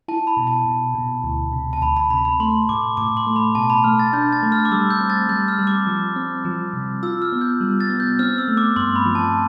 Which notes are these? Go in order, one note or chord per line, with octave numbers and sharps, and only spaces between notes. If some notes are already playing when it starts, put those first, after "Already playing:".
E4 A5
B5
B2
A5
B2
B2
D2
C3
A5
D2 B5
B5
C3 B5
B5
A3 C6
A2 D6
A2 D6
C6
A3
B5
B2 A5
B5
A3 F6
A6
D4 G6
A6
A3
F6
D6
G3 E6
G6
C4
A6
G3 G6
F6
G3
D6
F3
C4
F3
C3
F4 E6
F6
B3
G6
G3
A6
B3
G6
C4 F6
E6
A3
D6
G2 C6
B5
F3
A5